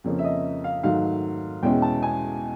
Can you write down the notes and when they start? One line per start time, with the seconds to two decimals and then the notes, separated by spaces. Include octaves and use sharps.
0.04 F2 C#3 F3 A#3 C#4
0.19 E5
0.24 D#5
0.64 F5
0.83 G#2 D#3 F#3 A3 F5
1.63 E2 B2 G#3 C#4 E4 G5
1.82 A5
2.03 G#5